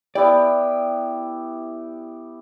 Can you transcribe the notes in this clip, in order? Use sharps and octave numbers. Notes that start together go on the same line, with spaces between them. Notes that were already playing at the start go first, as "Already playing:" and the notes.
B3 E4 G4 D5